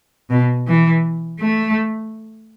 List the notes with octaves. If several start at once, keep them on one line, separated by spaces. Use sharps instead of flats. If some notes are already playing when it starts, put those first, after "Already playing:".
B2
E3
A3